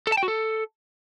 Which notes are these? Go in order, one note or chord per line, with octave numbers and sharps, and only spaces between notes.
A4
A5
G5
F#4
A4